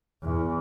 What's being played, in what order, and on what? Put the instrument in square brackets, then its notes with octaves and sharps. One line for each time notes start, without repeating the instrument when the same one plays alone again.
[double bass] E2